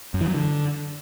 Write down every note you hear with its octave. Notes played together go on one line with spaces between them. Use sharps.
F#2
E3
F#3
D3